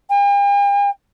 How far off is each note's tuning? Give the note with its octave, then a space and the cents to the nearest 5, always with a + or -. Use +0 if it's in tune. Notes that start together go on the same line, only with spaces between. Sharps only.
G5 +45